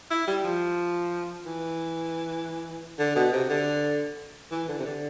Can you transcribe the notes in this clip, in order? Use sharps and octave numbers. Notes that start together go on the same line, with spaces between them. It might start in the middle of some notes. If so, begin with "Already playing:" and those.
E4
G3
F3
E3
D3
B2
C3
D3
E3
D3
C3
D3